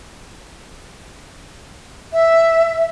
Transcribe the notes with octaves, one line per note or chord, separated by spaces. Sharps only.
E5